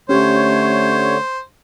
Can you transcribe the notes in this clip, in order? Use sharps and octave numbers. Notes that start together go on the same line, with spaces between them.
D3 A3 C#4 G4 C5 C#5